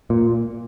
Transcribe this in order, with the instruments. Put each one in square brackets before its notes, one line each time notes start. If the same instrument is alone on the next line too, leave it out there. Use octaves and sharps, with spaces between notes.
[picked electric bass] A#2